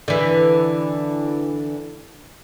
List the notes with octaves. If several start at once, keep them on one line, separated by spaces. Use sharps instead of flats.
D3 E3